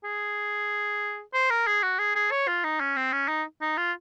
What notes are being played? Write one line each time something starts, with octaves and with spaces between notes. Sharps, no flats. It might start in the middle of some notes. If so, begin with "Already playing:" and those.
G#4
C5
A#4
G#4
F#4
G#4
G#4
C#5
F4
D#4
C#4
C4
C#4
D#4
D#4
F4